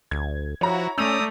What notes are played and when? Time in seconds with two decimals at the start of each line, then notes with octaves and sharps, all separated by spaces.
0.11 D2 G#6
0.61 F3 E4 F#4 C#5 A#5
0.98 A3 C#4 D5 A#5 D#6 E6 G6 F7